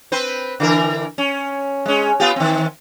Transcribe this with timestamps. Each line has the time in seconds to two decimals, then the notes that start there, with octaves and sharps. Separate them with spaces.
0.12 C4 B4 C5
0.60 D3 E3 A#4
1.18 C#4
1.86 G#3 C#4
2.20 B3 F4 G4
2.36 D#3 C4